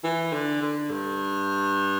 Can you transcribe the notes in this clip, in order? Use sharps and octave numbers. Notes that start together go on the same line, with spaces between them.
E3
D3
D3
G2